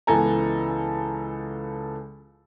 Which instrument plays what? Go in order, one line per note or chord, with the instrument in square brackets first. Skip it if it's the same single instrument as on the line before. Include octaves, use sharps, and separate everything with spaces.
[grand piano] C#2 E3 B3 A4 G#5 A#5